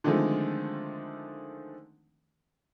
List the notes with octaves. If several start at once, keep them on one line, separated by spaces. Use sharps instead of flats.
D3 D#3 F3 G#3 A3 C4